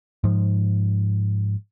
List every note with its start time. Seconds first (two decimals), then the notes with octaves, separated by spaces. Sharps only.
0.24 G#2 F3